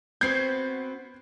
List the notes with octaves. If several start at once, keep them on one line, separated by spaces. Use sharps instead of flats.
B3 C4 F#4 G6 G#6 C7